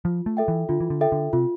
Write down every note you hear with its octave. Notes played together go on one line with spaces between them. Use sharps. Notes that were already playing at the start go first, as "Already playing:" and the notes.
F3 F4
A3
A4 E5 G5
E3
D3 F4
E3
D3
A4 E5 G5
D3
C3 F4